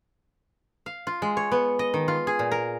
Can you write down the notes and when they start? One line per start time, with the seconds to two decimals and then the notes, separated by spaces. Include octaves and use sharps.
0.86 F5
1.07 F4
1.22 G#3
1.37 C#5
1.52 B3
1.79 D#5
1.94 D#3
2.08 F4
2.27 G#4
2.39 A#2
2.51 A#4